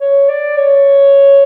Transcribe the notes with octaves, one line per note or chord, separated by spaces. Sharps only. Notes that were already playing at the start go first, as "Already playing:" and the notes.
C#5
D5
C#5